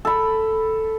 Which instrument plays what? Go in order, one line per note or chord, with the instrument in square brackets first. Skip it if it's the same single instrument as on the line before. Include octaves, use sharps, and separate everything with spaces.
[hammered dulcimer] A4 B5